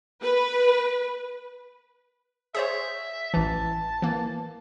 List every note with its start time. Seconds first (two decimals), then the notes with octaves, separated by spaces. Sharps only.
0.21 B4
2.55 G#4 C5 C#5 E5
3.34 A1 E3 A5
4.02 E3 A#3